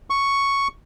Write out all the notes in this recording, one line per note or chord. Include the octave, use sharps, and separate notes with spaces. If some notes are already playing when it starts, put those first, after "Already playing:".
C#6